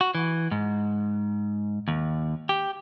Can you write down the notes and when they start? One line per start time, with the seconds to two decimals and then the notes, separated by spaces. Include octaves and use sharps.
0.01 F#4
0.15 E3
0.51 G#2
1.88 D#2
2.49 G4